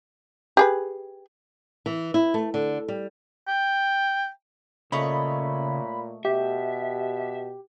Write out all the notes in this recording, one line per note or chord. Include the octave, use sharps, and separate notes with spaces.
G4 G#4 B4
E3
E4
A3
D3
G3
G5
A#2 C#3 A3 C#5 D#5 B5
B2 G4 E5